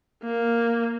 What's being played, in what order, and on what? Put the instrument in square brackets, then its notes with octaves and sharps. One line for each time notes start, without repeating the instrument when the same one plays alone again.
[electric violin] A#3